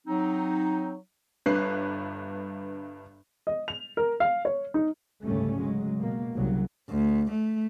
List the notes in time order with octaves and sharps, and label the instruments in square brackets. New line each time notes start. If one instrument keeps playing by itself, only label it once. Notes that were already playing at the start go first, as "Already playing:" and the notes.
[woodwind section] F#3 C4 D#4
[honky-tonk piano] G1 G2 B4 F#6 C7
[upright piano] D#5
F7
A#4
F5
C#5
D#4
[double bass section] G#1 D2 C#3 G3 A3 C#4
C#3 F#3 G#3
B2 A#3
C2 C#3 F#3
[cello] D2
A3